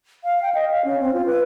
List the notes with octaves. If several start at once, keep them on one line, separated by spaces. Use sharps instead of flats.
F5
G5
D#5
F5
C#4
C4
F4
B4